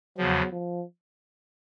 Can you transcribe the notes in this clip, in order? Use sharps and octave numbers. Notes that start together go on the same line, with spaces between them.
E2 C#3 F3 F#3
F3